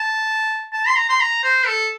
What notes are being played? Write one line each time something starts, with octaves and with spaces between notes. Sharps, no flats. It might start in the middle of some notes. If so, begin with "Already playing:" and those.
Already playing: A5
A5
C6
A#5
C6
A#5
C5
A4